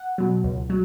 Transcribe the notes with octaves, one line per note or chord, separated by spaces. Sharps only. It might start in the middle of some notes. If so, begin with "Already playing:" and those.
Already playing: F#5
B2 F#3
C#2
F#3